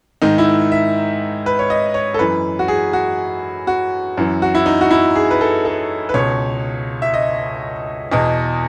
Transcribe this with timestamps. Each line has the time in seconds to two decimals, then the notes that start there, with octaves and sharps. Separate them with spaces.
0.22 G#2 D#3 D#4
0.38 E4
0.72 E5
1.46 B4
1.59 C#5
1.70 D#5
1.94 C#5
2.14 A4
2.19 F#2 E3 B4
2.59 F#4
2.68 G#4
2.93 F#4
3.67 F#4
4.17 F#2 E3
4.42 F#4
4.55 E4
4.66 D#4
4.81 F#4
4.91 E4
5.15 G#4
5.31 B4
5.41 A4
5.65 A4
6.09 B4
6.14 C#2 B2 C#5
7.02 E5
7.14 D#5
8.12 E2 B2 D#5